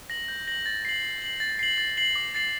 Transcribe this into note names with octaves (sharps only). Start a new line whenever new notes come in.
A#6 F#7
G6
A#6 F#7
A6
C7 F#7
A6
C7 F#7
A6
C7 F#7
A6
C7 F#7
D6
A6 C7 F#7